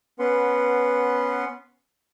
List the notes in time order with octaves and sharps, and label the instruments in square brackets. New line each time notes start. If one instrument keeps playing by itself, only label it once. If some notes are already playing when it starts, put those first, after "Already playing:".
[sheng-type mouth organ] B3 C#4 B4 F#5 C6